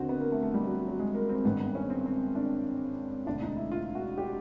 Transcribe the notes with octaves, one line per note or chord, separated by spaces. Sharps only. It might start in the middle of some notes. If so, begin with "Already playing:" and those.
Already playing: D#2 D3 C4 F#4
B3
A#3
A3
A3
G3
F#3
F#3
F#3
G#3
A#3
C4
G#1 G2 D#3 B3
B3
C#4
C4
C4
D4
E1 D2 D3 D4
D#4
E4
F4
F#4
G4